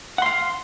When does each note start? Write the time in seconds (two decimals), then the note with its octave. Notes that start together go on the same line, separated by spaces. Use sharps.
0.18 F#5
0.22 C6
0.26 F5